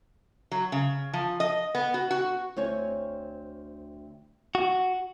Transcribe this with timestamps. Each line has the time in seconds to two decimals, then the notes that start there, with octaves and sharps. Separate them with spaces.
0.51 F#3
0.72 C#3
1.13 F3
1.40 D#5
1.75 B3
1.94 F#4
2.11 F#4
2.57 D2 C4 C#5 G#5
4.55 F#4